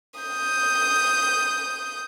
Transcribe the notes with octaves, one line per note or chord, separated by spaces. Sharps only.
D#6 G6